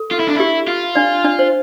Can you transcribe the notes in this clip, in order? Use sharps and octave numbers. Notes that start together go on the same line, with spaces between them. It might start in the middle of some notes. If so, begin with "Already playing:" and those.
Already playing: A4
F4
E4
D4
E4 G4
F4
D4 D5
D4 D5
C5